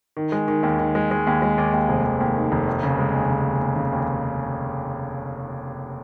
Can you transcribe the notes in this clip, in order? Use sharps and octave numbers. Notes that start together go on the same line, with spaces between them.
D#3
G#3
D#3
D#2
D#3
G#3
G#3
D#2
G#3
D#2
D#2
F1
D#2
D#2
D#3
F1
D#2
C#3
G#3
D#2
C#3
D#2
D#2
C#3
D#2